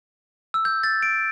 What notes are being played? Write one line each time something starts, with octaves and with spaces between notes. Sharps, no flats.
E6
G6
A6
D7